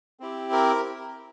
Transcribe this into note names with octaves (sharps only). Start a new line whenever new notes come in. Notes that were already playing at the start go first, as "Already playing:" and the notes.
C4 E4 G4
A#4